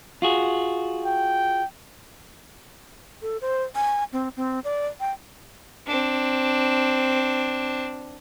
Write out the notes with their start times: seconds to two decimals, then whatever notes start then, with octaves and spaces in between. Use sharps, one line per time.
0.22 F4 F#4 G#4
1.06 G5
3.22 A4
3.41 C5
3.75 G#5
4.13 C4
4.37 C4
4.64 D5
5.00 G5
5.87 C4 D4